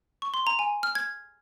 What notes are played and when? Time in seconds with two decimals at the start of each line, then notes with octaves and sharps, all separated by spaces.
0.22 C#6
0.34 C6
0.47 A#5
0.59 G#5
0.83 F6
0.95 G#6